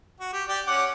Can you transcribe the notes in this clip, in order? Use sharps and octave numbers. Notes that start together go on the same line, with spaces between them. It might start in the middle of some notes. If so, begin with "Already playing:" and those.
F#4
G4
G4 D5 G5
C#4 F#5 D6